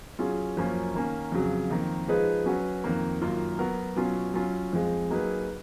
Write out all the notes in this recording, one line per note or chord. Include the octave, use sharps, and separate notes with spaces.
F#3 C#4 F4 G#4
F#2 F3 A#3 C#4
D#3 A#3 C#4
F2 C#3 F#3
F2 D#3 A#3
F3 G#3 D#4 G#4 B4
F#3 C#4 F#4 B4
F2 D#3 A#3
F#2 D#3 A#3 F4
F#3 B3 F#4 A#4
B2 F#3 C#4 F4
F#3 C#4 F4
F2 F3 G#3
F#3 A#3 D#4 G#4 B4